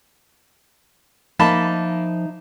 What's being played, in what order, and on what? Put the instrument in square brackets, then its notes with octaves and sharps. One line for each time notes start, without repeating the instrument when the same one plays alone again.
[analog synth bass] F3 [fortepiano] A#3 A5 B5 [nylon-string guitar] D#4 D#5 E5